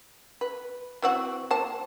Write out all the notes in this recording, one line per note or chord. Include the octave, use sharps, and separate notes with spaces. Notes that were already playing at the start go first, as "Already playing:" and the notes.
B4
E3 C4 F#4
A#3 C5 A5